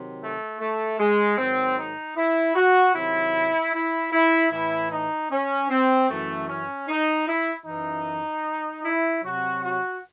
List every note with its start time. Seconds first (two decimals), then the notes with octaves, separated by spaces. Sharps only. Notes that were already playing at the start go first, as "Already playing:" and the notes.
Already playing: C3 D#3 F#3
0.21 A3
0.60 A3
0.99 G#3
1.38 G#2 D#3 F#3 C4
1.77 D#4
2.17 E4
2.56 F#4
2.95 C3 D#3 F#3 E4
3.74 E4
4.13 E4
4.52 A2 E3 E4
4.92 D#4
5.31 C#4
5.70 C4
6.09 F#2 E3 A3
6.49 C#4
6.89 D#4
7.28 E4
7.66 F#2 E3 D#4
8.84 E4
9.23 C3 F#3 F#4
9.63 F#4